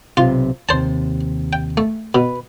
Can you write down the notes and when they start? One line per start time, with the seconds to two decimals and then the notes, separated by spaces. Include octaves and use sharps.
0.17 B1 C3 F4
0.69 D#2 C3 C5 A5
1.53 G5
1.77 A3
2.15 B2 B4